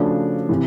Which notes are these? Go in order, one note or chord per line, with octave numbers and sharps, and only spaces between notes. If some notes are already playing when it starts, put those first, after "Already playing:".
Already playing: C#3 F3 A3 D4 F#4
C3 E3